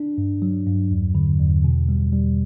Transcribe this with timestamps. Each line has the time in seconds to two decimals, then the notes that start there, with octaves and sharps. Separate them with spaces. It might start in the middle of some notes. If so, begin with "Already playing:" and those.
Already playing: D4
0.18 G2
0.42 F#3
0.67 G2
0.91 E2
1.15 D3
1.39 E2
1.64 B2
1.89 G3
2.13 G3